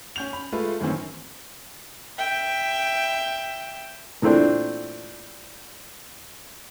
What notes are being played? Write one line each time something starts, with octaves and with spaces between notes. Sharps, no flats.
C#4 G6 F7
B5
G#3 A3 F4 B4
F#2 A2 D#3 E3 C4 C#4
E5 G5
A#2 E3 A3 C4 D4